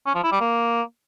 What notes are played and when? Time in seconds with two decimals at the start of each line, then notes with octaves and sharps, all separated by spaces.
0.06 C#4
0.15 F3
0.23 E4
0.32 G3
0.41 A#3